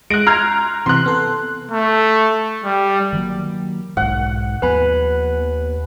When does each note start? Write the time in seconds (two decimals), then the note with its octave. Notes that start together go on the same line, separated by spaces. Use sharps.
0.10 G#3 F#6 A#6 D7
0.26 A#5 C6 F6 G6 G#6
0.86 C3 E3 C6 F#6
1.06 B3 A4
1.71 A3
2.64 G3
3.13 D#3 F#3 A#3
3.97 B1 G#2 F#5
4.62 D#2 F3 B3 B4 G#5 B5